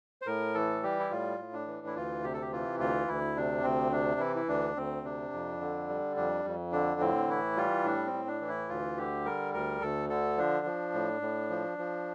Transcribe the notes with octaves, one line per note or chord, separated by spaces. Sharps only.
C5
A2 A#4
E3 A4
G3 G4
E4
A2 F4
A2
D4
E3
E4
D2 F4
C3 G4
A4
G4
E3 F4
D2 F4
D2 E4
C3 D4
D2 C4
C3 D4
E3 E4
E4
D2 D4
D2 C4
C3 D4
F2
D3
G3
F2 D4
F2
D3 D4
A2 C4
E3 E4
G3 F4
A2 D4
C4
A2
D4
E3
E4
D2 F4
D3 G4
G3 A#4
D2 A#4
D2 A4
D3 A4
F3 D4
F3
A2
A2
F3
F3